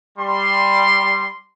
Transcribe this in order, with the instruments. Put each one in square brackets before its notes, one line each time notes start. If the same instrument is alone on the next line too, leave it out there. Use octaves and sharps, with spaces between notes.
[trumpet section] G3 C6